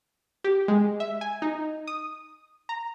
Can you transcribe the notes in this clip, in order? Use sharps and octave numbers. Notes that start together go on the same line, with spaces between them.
G4
G#3
E5
G#5
D#4
D#6
A#5